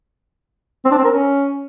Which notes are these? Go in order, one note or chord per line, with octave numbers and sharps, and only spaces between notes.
C4
D4
C4
A#4
C#4